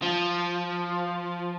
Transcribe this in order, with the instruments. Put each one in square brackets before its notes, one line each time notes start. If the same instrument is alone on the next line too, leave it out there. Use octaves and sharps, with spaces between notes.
[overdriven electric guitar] F3